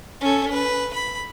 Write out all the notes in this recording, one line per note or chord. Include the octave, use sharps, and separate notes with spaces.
C#4 A4
B4
B5